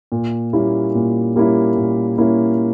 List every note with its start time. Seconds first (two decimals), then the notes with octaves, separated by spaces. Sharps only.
0.12 A#2
0.53 G3 A#3 C#4 E4
0.95 A#2
1.36 G3 A#3 C#4 E4
1.77 A#2
2.18 G3 A#3 C#4 E4